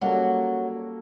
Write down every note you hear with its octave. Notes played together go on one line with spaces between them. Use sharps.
F#3 G3 A#3 C#4 F#4 A4